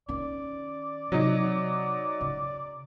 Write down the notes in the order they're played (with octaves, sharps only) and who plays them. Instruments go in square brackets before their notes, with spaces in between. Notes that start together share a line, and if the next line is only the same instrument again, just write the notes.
[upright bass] D#3 C#4 [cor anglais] D5
[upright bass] C3 [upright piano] F#3 D#4
[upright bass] C#3